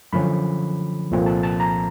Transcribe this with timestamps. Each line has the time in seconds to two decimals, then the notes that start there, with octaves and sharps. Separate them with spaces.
0.13 F#2 D3 F3 A3 C#4 B5
1.11 C2 A#2 F3 A3 C4
1.26 A5
1.43 A5
1.60 A#5